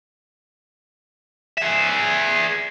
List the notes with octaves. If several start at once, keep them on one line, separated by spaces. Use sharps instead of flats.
G#4 E5